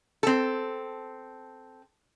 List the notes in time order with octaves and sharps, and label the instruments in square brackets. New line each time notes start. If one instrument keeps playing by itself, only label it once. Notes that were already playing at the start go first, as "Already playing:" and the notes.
[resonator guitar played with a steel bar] C4 A4